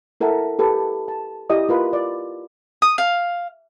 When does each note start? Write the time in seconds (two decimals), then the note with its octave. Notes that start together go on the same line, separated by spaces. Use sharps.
0.21 E4 A4 A#4 E5 F#5 A5
0.59 G4 A4 B4
1.08 A5
1.50 E4 G4 D5 D#5 D#6
1.69 F4 A#4 B4
1.93 D5
2.82 D#6
2.98 F5